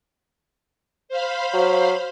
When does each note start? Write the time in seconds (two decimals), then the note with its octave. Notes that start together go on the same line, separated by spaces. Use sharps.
1.09 C5 F5 B5
1.54 F#3